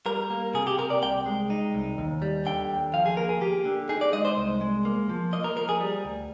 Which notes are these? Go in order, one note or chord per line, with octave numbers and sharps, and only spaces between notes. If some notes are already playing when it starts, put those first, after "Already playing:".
G3 A#4
A#3
C3 G#4
G4
C3 A#4
D5
C2 G5
G#3
D#4
C2
D#2
G3
D3 G5
D#2
F3 F5
G#4
A#3 A#4
G#4
A#3 G4
D3
D#4 G#4
D5
G#3 D#5
C5
C2
G#3
A#3
F3
A#3 D#5
A#4
F3 A#4
G#4
G3
D2